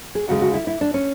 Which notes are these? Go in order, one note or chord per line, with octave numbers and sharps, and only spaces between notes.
G#4
D2 C#3 G#3 F#4
F#4
E4
E4
D4
C#4